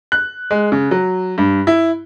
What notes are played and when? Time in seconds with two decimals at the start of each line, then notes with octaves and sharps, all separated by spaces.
0.12 F#6
0.51 G#3
0.72 C#3
0.91 F#3
1.38 G2
1.67 E4